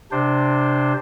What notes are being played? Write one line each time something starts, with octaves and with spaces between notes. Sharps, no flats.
C3 D4 C5